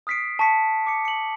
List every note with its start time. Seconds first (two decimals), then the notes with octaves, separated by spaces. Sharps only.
0.07 D#6 F6 B6 C7 D7
0.39 A5 C#6 B6 C#7
0.87 D6 C#7
1.05 C#7 F#7